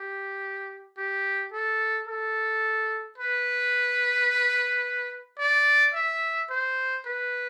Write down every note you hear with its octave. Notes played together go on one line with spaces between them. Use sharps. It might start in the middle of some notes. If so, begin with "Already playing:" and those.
Already playing: G4
G4
A4
A4
B4
D5
E5
C5
B4